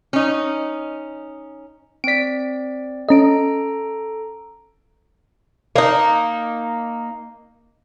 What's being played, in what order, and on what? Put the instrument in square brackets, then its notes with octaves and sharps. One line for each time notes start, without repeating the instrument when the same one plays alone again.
[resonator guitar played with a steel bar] C#4 D#4
[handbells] C4 D5 [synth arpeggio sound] B6 D7
[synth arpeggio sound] C#4 D#5 [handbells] A4 A#5 D7
[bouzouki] A#3 D#4